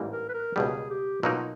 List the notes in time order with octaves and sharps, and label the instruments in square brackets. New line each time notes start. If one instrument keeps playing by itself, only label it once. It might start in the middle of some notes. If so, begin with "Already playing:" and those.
Already playing: [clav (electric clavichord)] A1 G#2 E3 G3 A#3
[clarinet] A#4
B4
A#4
[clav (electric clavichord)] C#2 B2 G3 [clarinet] G#4
[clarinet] G4
[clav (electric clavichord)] B2 F#3 A#3 D#4 [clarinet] F4